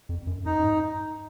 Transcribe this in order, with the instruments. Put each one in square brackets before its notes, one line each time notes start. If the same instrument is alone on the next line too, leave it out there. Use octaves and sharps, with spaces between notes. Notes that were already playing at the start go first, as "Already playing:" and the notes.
[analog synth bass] F2
F#2
[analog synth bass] F#2 [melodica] D#4
[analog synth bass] G#2